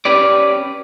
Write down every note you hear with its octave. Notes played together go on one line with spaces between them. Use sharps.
C#4 G4 B4 D5